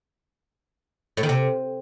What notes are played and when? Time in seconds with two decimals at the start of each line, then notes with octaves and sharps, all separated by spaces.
1.17 A2
1.23 D#3
1.29 C3